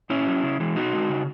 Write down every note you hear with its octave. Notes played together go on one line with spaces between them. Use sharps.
A#2 C#4 E4
F#3
C#3
E3 G#3
B2 D#4 F#4
G#3
C#3